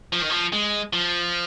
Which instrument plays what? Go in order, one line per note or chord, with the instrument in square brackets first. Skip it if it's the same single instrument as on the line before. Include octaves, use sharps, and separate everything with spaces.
[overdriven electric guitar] F3
D#3
F3
G#3
F3